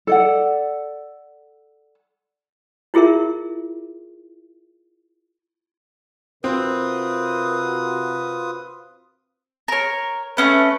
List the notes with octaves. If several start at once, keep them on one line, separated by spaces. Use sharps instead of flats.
A4 D5 F#5
E4 F4 G#4 A#4 E5
C3 C4 F4 F#4 A#4 B4 D#6
A#4 C#5
A3 A#3 C#4 B4